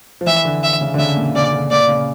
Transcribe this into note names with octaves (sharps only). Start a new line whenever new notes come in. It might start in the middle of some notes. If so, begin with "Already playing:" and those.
F3
E3 E5
D3
E5
C#3
D3
C#3 E5
A#2
C#3 D5
D3
A#2 D5
C#3